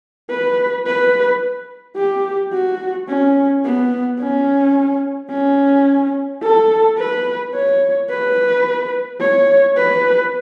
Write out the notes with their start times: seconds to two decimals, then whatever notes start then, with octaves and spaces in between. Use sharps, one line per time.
0.30 B4
0.86 B4
1.96 G4
2.53 F#4
3.08 C#4
3.65 B3
4.19 C#4
5.30 C#4
6.43 A4
6.98 B4
7.54 C#5
8.10 B4
9.20 C#5
9.77 B4